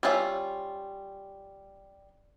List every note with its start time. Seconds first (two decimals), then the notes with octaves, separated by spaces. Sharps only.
0.03 G3 C#4 F4 E5